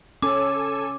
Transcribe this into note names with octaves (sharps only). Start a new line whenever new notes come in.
C#4 A4 G#5 D6 E6